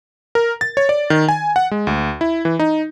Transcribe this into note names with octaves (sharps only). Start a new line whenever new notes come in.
A#4
A6
C#5
D5
D#3
G#5
F#5
G#3
D2
E4
E3
D#4